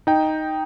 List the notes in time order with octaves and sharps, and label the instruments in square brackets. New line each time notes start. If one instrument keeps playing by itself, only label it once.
[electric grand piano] D#4 G5